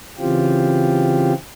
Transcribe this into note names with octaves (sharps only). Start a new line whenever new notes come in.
C#3 E3 C4 F4 G4